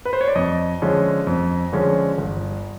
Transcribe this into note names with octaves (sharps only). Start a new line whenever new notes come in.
B4
C5
C#5
D5
F2 D#5
D3 F3 G#3 C#4
F2
D3 F3 G#3 C#4
G1